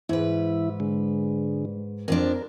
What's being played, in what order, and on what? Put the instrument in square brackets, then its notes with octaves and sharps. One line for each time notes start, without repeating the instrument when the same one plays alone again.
[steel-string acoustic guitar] G#2 B4 [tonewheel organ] E3 E4
[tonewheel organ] D3 G#3
[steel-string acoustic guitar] F2 F3 D4 [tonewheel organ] A#4